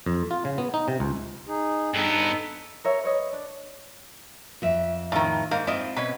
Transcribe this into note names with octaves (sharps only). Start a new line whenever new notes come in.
F2
F4
C#3
B3
D#4
C3
C#2
D#4 G#4
G2 B3 D#4 A4
A#4 C#5 E5
B4 C#5 D#5
D4
F2 E5
A2 D#3 F4
G#2 A#3 C5 F5
C4 E4 F4 D#5
B2 C#4 B4